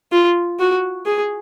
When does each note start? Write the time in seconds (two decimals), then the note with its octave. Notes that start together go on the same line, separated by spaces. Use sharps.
0.12 F4
0.59 F#4
1.06 G#4